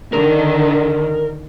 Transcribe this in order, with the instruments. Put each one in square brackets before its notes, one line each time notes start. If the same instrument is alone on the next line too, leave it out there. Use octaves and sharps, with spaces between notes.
[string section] D3 D#3 [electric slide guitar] A#4